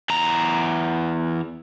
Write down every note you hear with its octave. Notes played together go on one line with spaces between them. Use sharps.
E2 A#5